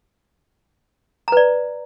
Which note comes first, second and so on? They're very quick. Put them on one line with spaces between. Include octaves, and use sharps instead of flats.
A#5 B4 D5